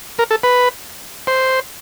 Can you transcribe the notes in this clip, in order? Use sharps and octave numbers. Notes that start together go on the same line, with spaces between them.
A#4
A4
B4
C5